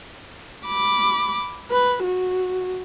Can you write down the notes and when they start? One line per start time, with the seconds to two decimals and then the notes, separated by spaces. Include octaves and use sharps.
0.65 B5 D6
1.71 B4
2.03 F#4